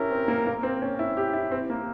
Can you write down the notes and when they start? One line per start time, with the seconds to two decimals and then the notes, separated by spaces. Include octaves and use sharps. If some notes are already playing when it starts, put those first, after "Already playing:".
Already playing: C#4 E4 G4 A#4
0.11 C4
0.28 A#3
0.47 A#3
0.63 C4
0.82 C#4
0.99 E4
1.17 G4
1.33 E4
1.51 C4
1.70 A#3